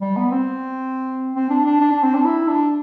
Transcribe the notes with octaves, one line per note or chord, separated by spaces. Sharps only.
G3
B3
C4
C4
D4
D4
D4
D4
C4
D4
E4
D4